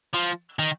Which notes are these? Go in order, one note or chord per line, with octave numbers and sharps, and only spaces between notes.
F3
D#3